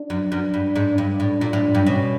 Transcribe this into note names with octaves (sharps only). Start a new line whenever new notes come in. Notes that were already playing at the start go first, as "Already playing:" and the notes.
Already playing: D4
F#2
F#2
G2
G#2
G2 D4
A2
A#2 D4
A2
G2
B2 C#4